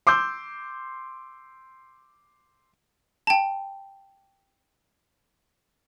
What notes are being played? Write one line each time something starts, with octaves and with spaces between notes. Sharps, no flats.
C6 D6 E6 G6
G5 A5